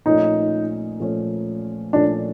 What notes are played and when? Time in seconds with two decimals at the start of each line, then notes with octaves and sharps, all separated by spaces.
0.06 A#2 F3 A3 C#4 D#4
1.00 A#2 F3 A3 C#4
1.93 A#2 F3 A3 C#4 D4